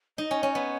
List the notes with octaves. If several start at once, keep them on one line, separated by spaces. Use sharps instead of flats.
D#4 D#5
C#4
C#4
B3 C#5